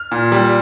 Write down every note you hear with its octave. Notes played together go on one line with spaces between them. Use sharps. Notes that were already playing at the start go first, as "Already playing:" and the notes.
Already playing: F6
A#2
G3